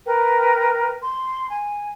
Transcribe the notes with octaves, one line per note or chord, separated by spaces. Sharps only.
A#4 B4 G5
C6
G#5